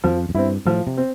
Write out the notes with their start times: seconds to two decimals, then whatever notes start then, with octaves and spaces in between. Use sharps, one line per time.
0.04 F2 F3
0.29 F2
0.35 G2 C4 E4
0.66 A2 F3
0.87 C3
0.97 C4